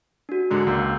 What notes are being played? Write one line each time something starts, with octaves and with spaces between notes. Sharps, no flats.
D4 F#4
G#2 D3 G#3 A#5 C6
C#2 D3 A#3 A#5 E6 G6